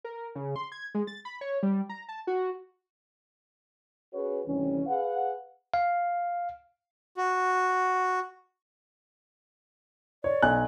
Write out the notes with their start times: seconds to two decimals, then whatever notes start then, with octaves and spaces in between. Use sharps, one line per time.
0.04 A#4
0.35 C#3
0.56 C6
0.72 G#6
0.95 G#3
1.07 A6
1.25 B5
1.41 C#5
1.63 G3
1.89 A#5
2.09 A5
2.27 F#4
4.14 C#4 F#4 G#4 B4 C#5
4.47 D2 C3 D#3 E3 G3 C#4
4.86 G#4 B4 F5 F#5
5.74 F5
7.17 F#4
10.24 C#5 D5
10.42 B1 G#5 F#6